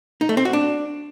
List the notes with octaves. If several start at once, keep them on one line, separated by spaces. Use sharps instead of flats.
D#4
A3
C4
F#4
D4